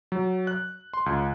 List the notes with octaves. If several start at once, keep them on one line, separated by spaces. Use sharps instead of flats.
F#3
F#6
C6
C#2